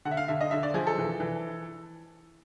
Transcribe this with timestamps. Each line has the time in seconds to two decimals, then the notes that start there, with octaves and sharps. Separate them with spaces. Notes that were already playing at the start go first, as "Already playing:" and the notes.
0.05 D3 F#5
0.11 E5
0.17 F5
0.28 D3 E5
0.41 D#5
0.51 D3 E5
0.63 D5
0.74 F3 G#4
0.87 A4
0.98 E3
1.20 E3